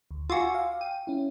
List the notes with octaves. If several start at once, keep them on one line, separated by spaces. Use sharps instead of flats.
D2
F4 F#4 G#5 D6 E6
F5
G5 D#7
C#4 E4